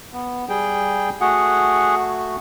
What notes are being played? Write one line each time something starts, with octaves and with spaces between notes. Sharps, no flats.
B3
G3 G#4 G5
A3 F#4 G#4 F#5